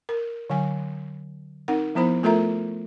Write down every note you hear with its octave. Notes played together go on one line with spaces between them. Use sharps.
A#4
D3 F#3 G#5
C4 D#4 A#4 F#5
F3 B3 E4 C5 B5
A3 F4 A4 A#4 E5 A#5